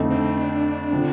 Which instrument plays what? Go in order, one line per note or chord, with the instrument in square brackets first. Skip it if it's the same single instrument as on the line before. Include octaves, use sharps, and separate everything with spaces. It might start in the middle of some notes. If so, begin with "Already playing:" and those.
Already playing: [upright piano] F2 D3 A3 D#4 A4
[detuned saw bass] C4
D4
[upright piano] D3 F3 C4